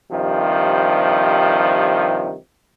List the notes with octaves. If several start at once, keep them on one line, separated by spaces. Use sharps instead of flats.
G2 C3 D#3 F3